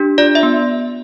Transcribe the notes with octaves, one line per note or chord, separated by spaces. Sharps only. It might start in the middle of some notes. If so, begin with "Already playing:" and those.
Already playing: D4 G4
F4 D5
E5
B3